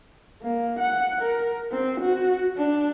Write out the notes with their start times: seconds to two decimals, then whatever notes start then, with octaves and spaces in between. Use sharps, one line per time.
0.43 A#3
0.79 F#5
1.22 A#4
1.72 C4
2.01 F#4
2.57 D4